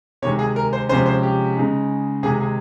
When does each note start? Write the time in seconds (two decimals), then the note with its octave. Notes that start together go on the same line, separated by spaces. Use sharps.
0.22 C3 D#3 G#3 C#5
0.39 G#4
0.56 A#4
0.73 C5
0.89 C3 F3 G#3 C#4 C5
1.06 C5
1.23 G4
1.56 C#3 G#3 D#4
2.23 C3 D#3 G#3 D#4 G#4
2.40 G#4